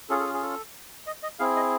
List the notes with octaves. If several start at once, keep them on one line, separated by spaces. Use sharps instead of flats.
C#4 F4 G#4 A4
A4
G#4
A4
D#5
D#5
C4 E4 G#4 F5
D#5